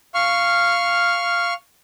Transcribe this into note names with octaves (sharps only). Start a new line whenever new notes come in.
F5 C#6 F6